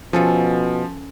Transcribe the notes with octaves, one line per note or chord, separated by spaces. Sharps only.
B2 F3 C#4 A4 F5